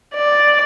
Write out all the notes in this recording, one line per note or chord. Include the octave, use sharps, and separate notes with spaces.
D5